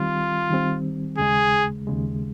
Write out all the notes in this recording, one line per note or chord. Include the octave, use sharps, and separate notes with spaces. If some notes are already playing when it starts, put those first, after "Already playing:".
Already playing: D#3 G3 C4 F4
D#3 G3 C4
D#2 C#3 G#3 G#4
D#2 C#3 G#3